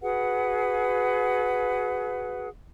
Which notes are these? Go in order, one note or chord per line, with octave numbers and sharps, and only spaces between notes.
F#4 G#4 B4 F#5